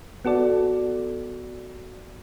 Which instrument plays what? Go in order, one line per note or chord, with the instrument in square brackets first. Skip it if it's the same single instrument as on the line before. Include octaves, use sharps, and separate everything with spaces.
[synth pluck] B3 F#4 A4 D5